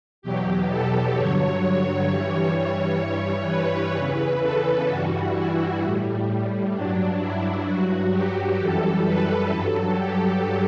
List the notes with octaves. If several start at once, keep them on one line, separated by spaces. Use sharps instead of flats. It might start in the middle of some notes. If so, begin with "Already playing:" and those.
E2 B2 F#3 G4
A4
G2 D3 F#3 C#5
C#5
G2 E3 G3
G2 E3 G3 C#5
B4
E2 C#3 E3
A4
G2 E3 G3 F#4
E4
A2 G3
G2 F#3 D4
E4
G2 F#3 F#4
G4
F#2 E3 G3 A4
B4
G2 F#3 A4
G4